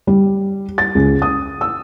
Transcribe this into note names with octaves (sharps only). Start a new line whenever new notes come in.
G3
A6
C#2
D#6
E6